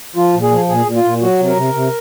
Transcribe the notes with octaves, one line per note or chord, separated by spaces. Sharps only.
F3 F4
A#2
G#4
F3
A#2 G#4
A#2
F4
A#2
F#3 F#4
C3
A#4
C3
C3